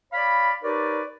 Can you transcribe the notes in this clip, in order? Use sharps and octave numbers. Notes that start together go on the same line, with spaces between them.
C#5 D5 F5 B5
D#4 G4 A#4 B4 C#5 D5